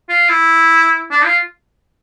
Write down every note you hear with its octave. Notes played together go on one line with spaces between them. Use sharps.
F4
E4
D4
F4